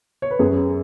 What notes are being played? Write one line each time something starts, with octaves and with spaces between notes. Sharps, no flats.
C#5
B4
F#2 G#4